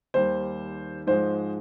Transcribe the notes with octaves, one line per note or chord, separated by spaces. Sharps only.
D#2 D#3 G3 C5
G#2 F3 G#3 C5